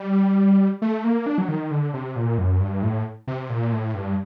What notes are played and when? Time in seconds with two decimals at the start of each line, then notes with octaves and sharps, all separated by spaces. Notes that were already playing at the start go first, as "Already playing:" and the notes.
Already playing: G3
0.82 A3
1.04 A#3
1.26 D4
1.38 F#3
1.49 D#3
1.71 D3
1.94 C3
2.16 A#2
2.38 F#2
2.60 G2
2.83 A2
3.27 C3
3.50 A#2
3.72 A2
3.95 G2